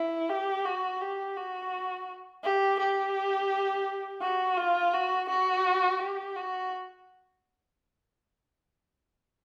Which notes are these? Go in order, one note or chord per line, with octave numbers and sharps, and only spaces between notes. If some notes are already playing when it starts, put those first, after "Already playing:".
Already playing: E4
G4
F#4
G4
F#4
G4
G4
F#4
F4
F#4
F#4
G4
F#4